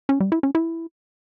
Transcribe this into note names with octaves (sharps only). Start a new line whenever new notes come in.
C#4
G3
E4
C#4
E4